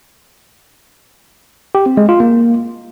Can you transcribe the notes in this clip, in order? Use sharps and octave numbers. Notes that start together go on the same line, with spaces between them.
G4
C4
G#3
F4
A#3